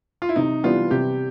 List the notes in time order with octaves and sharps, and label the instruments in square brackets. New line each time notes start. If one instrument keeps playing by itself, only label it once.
[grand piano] F4
E4
[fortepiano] C3 [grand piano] D#4
[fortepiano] E3 G3 B3 D4 [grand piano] F4
[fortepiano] C3 [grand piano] G4